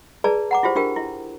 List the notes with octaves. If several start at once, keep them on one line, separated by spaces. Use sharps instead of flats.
G#4 B4 D5 A5 A#5
F#5 A#5 D6
E4 F4 G4 C5
D4 F4 G4 A#4 G5
E4